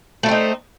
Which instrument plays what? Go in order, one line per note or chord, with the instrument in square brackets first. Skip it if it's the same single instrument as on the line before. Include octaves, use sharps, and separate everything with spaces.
[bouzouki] A3
E4
C4
D#4